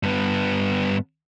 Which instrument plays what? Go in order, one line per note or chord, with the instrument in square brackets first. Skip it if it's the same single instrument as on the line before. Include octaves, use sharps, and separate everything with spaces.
[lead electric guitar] G2 B3